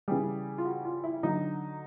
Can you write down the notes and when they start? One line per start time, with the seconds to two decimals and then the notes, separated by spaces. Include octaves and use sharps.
0.08 C#3 E3 G3 G#4
0.58 F4
0.65 F#4
0.85 F4
1.04 E4
1.23 D3 F#3 D#4